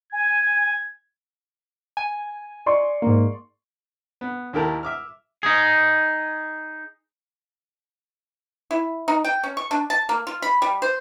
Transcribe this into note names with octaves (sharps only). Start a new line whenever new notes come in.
G#5 G#6
G#5
D5 C6 C#6
G#2 A#3
B3
D#2 E4 G4 A#4 A5
E5 D6 F6
D#4 G#4
E4
D#4
G5
C#4
C#6
D4
A5
A#3
F4
B5
G3
C5